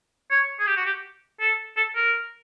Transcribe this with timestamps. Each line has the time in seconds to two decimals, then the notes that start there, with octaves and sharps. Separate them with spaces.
0.31 C#5
0.60 G#4
0.67 G4
0.77 F#4
0.86 G4
1.41 A4
1.77 A4
1.96 A#4